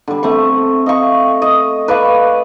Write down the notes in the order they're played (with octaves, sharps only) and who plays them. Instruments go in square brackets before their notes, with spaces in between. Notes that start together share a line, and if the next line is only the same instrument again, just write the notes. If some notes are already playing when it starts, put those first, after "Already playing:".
[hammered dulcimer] D3 G3
A3 C4 C#6
D#5 F5 C#6
D#5
B4 D5 F5 C#6